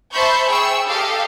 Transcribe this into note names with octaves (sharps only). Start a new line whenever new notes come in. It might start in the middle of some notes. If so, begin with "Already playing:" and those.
C5 E5 A5 B5 C#6 G6
G#4 G5 C#6 E6
G4 A4 D#5 F5